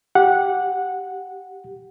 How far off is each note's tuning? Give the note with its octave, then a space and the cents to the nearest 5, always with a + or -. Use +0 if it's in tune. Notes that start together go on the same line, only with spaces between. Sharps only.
G4 -10 F#5 -15